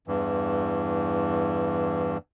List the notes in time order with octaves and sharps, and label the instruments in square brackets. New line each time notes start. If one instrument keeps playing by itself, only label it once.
[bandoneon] E2 G2 E3